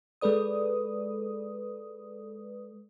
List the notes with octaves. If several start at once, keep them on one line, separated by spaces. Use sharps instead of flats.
G#3 A4 B4 D5 D#6